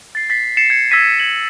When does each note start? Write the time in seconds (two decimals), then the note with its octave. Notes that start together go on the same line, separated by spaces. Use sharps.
0.15 A6 C7
0.30 A6 B6 C7
0.57 A6 C7 C#7 E7
0.70 G#6 C#7
0.91 E6 G#6 A#6 B6 D#7
1.20 G#6 F#7